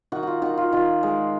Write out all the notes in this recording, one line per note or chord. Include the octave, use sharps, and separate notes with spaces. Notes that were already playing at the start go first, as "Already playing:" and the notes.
D#3 F#4
F4 F#4
D#3 F#4
F4
D#3 F4
G#3